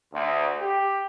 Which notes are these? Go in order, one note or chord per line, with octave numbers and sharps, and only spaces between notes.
D2
G4